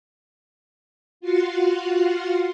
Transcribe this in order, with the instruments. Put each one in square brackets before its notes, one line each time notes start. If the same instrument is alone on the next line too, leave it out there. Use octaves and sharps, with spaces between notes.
[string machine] F4 F#4 F5 F#5 C6